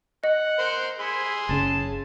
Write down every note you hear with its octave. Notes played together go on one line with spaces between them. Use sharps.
D#5 F#5
A#4 C5 C6
E4 G#4 C6
F#1 A#2 C#3 A5